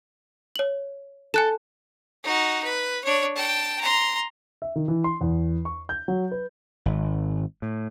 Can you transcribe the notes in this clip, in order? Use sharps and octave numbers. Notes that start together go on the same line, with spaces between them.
C#5 F#7
A4 G#5 F#6 E7
D#4 F#4
B4
D4 C#5
G5 A5
A#5 C6
E5
D#3
E3
C6
E2
C#6
G6
F#3
B4
G#1
A2